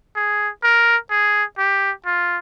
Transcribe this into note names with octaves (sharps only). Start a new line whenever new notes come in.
G#4
A#4
G#4
G4
F4